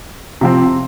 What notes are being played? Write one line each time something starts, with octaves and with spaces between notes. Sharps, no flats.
C3 F3 C4